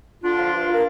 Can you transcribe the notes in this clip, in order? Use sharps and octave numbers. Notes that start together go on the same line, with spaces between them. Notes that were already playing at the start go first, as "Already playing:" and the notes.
D3 D4 F4
F3
G2
A#3 A#4